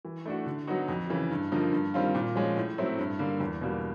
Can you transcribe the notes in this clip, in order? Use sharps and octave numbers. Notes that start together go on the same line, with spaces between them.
E3
A3 D4 F#4
D3
F#3 B3 D#4 F#4
F2
C#3 E3
G2
D3 F3 A#3 D#4
G2
D#3 G3 C4 F4
A#2
F3 G#3 C#4
A2
F#3 A3 C4 E4
G2
D3 G3 A#3
E2
B2 G3 A#3